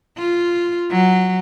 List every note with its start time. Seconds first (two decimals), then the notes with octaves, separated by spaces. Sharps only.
0.18 F4
0.91 F#3